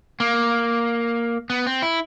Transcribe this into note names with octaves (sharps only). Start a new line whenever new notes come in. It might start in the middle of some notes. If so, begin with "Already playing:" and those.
A#3
B3
C4
E4